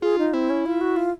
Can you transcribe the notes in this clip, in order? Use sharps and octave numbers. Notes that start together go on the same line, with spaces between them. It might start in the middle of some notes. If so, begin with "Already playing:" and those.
F4 G#4
D#4
C4 E4
C#4
F4
F#4
F4